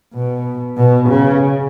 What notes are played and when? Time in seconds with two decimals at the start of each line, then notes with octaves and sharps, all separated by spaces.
0.14 B2
0.77 B2
1.09 C#3